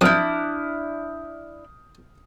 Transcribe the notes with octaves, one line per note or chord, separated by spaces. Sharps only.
F2 D4 E4 D#6 F6 G6